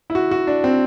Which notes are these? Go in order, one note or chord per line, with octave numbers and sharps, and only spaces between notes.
E4
F#4
F#4
D4
C4